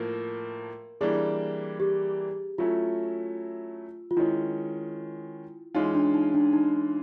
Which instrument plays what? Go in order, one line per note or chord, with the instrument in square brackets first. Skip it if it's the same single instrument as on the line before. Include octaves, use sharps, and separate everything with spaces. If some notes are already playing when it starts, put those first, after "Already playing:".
Already playing: [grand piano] A2 F3 A#3 [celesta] A#4
[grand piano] E3 G3 A#3 D4 [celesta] G#4
[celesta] G4
[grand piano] F#3 A3 C#4 E4 [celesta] F4
[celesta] F4
[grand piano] D#3 G#3 C#4 [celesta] E4
[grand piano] E3 G#3 C#4 F4 [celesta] D#4
[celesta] D4
D#4
D4
D#4